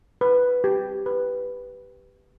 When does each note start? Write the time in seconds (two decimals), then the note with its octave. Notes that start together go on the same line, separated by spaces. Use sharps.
0.21 B4
0.64 G4
1.06 B4